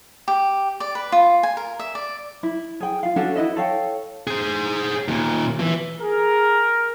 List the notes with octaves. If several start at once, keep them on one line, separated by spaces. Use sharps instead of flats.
G4
D5
B4
F4
G#5
A#4
E5
D5
E4
G#4 G5
F4 F5
C#4 D4 F#4 A4
E4 B4 D#5 E5
A4 C#5 F5 G5
G#4 C5
D#2 A#2
E3
G#4 A#4